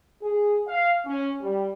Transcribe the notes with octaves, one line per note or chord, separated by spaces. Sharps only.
G#4
F5
C#4
G3